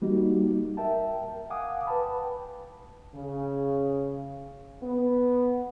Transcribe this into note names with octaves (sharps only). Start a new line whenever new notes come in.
G3 A#3 D#4 F#4 G4
A#4 E5 G5 A5
F5 F#5 G#5 D6 D#6
B4 G5 A5 B5
C#3
B3